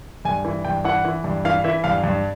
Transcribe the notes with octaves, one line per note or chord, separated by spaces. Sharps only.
G2 G#5
E3
G2 G5
E3 F#5
E3
G2
E3 F5
E3 E5
G2 F5
G2